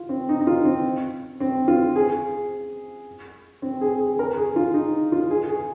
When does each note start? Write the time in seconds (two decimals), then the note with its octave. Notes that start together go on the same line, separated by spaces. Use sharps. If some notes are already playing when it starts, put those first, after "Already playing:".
Already playing: F4
0.09 C4
0.29 D#4
0.40 D#4
0.47 F4
0.65 C4
1.40 C4
1.68 F4
1.96 G#4
3.62 C4
3.81 G#4
4.00 G#4
4.19 A#4
4.37 G#4
4.56 F4
4.74 D#4
5.12 F4
5.31 G#4
5.48 G#4